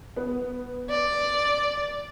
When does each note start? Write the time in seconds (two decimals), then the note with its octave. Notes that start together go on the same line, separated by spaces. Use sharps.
0.17 B3 B4
0.90 D5